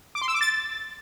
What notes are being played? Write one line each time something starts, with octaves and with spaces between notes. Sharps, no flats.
D6
C6
E6
D6
A6